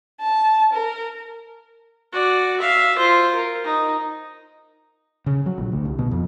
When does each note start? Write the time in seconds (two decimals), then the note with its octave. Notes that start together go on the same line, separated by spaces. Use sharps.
0.21 A5
0.73 A#4
2.12 F#4 D5
2.60 E5 F5
2.98 F4 C5
3.35 A#4
3.64 D#4
5.26 C#3
5.46 F#3
5.58 A#1
5.72 D2
5.85 C2
5.99 B2
6.11 F2